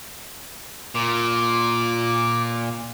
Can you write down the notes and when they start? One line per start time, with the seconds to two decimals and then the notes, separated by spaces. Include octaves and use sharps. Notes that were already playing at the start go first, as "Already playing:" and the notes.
0.95 A#2 D6